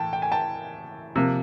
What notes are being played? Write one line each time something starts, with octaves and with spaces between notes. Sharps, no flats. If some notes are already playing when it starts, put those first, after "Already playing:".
Already playing: A2 E3 A3 G5 A5
G5
G#5
G5 A5
C3 F3 A#3